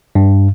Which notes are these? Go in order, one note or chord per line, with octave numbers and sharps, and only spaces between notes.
G2